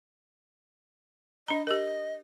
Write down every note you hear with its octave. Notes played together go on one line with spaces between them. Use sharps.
D4 D#5 A#5
G4 A#4 D#5